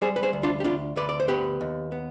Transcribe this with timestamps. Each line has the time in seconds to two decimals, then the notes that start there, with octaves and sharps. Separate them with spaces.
0.02 G3 G#4 C5
0.16 B4
0.23 G#4 C5
0.33 D2
0.43 D4 F4
0.60 G4
0.64 D2 D4 F4
0.96 D2 B4 D5
1.09 D5
1.20 C5
1.28 B3 G4 B4
1.61 D#2
1.92 B3